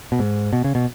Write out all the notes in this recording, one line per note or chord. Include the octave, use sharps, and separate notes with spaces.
B2
G#2
B2
C#3
B2